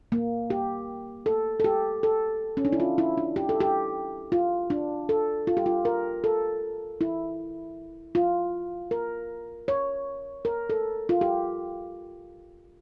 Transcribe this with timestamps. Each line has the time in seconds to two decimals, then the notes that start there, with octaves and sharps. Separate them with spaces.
0.12 A#3
0.50 G4
1.26 A4
1.60 A4
1.64 G4
2.03 A4
2.57 C#4
2.65 D4
2.73 E4
2.80 F4
2.98 E4
3.17 D4
3.36 G4
3.49 A4
3.60 G4
4.32 F4
4.70 D4
5.09 A4
5.47 F4
5.57 G4
5.66 F4
5.85 A#4
6.24 A4
7.01 E4
8.15 F4
8.91 A#4
9.68 C#5
10.45 A#4
10.70 A4
11.09 F4
11.21 G4